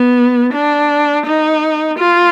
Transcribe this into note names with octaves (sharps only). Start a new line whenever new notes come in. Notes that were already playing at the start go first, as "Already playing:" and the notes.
Already playing: B3
D4
D#4
F4